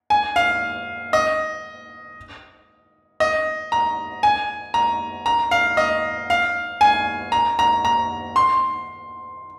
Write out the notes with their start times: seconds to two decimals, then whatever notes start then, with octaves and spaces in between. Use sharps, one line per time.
0.10 G#5
0.36 F5
1.13 D#5
3.20 D#5
3.72 A#5
4.23 G#5
4.74 A#5
5.26 A#5
5.51 F5
5.77 D#5
6.30 F5
6.81 G#5
7.32 A#5
7.59 A#5
7.85 A#5
8.36 C6